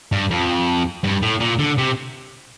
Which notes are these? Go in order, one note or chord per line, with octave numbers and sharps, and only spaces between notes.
G2
F2
G2
A2
A#2
D3
C3